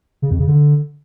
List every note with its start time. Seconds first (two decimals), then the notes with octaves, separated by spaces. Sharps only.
0.22 C#3
0.31 F2
0.39 C#3
0.48 D3